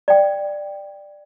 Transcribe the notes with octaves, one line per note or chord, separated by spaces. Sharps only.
D5 G5